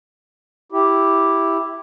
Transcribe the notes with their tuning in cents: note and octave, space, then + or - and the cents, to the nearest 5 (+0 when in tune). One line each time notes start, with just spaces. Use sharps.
E4 +0 G4 +0